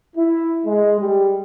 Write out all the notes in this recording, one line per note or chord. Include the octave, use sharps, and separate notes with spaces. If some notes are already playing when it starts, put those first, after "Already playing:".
E4
G#3
G3